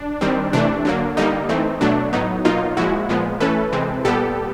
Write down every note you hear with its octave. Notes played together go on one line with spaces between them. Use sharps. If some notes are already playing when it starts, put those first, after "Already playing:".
Already playing: D4
D#3 G3 C4
C3 E3 A3 D4
D3 F#3 A#3
D3 G3 A#3 D#4
E3 A3 C4
B2 F#3 A3 D4
A2 F#3 B3 D#4
B2 F#3 A#3 D#4 F4
A#2 F3 G#3 E4 F#4
A#2 F3 G#3 B3
E3 A3 C#4 A4 B4
C3 E3 G#3 C4
A#2 G3 B3 G4 A4